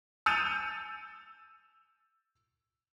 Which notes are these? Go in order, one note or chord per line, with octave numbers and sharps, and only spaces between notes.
E6 G6 A6 C#7 D#7 F7